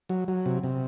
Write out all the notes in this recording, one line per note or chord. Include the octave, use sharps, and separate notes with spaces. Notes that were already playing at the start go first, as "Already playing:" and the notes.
F#3
F#3
C3
C3